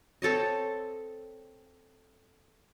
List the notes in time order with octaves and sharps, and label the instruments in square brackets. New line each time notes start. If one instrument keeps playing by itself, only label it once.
[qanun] C4 A4 C#5 D#5